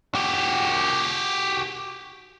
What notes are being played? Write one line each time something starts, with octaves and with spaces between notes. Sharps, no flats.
F#4 G4